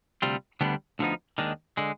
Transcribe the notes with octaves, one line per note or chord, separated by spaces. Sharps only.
D2 C3 G3 C4 F4
D2 D3 G3 B3 D4
D2 D3 F3 B3 D#4
D#2 D#3 G#3 D4
D3 G#3